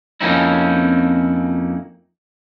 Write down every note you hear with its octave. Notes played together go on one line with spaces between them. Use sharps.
F2 A#3 C4 C#4 D#4 E4